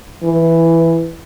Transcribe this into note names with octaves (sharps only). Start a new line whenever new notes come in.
E3